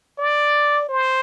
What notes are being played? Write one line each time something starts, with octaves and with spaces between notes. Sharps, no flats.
D5
C5